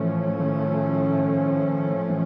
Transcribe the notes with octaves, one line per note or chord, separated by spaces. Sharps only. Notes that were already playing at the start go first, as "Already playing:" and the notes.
Already playing: A2 E3 F3 A3 C#4
D#3
E3